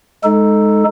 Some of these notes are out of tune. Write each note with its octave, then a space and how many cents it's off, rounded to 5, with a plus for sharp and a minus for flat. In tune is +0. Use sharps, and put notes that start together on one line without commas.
G#3 +0 D#4 +0 A4 +0